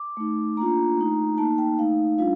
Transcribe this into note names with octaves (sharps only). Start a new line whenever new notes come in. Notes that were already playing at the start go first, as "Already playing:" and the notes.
Already playing: D6
A3 D#4
A#3 D4 F4 A#5
A3 D#4
A#3 D#4 A5
G5
A3 D#4 F5
G3 D4 F4 F5